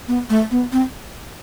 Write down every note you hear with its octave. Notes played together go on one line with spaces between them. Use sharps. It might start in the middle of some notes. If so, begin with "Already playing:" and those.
B3
A3
B3
C4